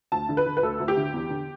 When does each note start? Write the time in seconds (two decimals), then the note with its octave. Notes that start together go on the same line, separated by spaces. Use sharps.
0.12 D2 A5
0.29 D3
0.37 B4
0.46 D3
0.57 B4
0.63 D2 A4
0.80 D2
0.88 G4
0.97 D3
1.14 E2
1.30 D3